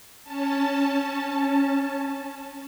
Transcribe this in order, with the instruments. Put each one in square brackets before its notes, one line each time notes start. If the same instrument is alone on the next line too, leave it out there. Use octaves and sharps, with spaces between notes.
[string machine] C#4 A5